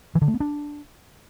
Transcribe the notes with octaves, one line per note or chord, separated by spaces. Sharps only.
E3
D3
A3
B3
D4